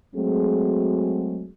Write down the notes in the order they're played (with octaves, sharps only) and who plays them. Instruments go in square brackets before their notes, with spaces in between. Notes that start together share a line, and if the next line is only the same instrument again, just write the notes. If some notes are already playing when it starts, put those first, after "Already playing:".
[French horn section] F#3 G#3 A3 C4 F#4 G#4